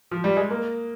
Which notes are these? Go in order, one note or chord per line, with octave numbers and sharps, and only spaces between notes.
F3
G3
G#3
A#3